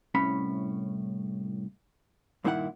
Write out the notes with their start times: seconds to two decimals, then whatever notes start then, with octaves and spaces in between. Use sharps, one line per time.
0.15 C2 A2 C#4 B5
2.44 G2 A#2 D#3 E4 E5 F#5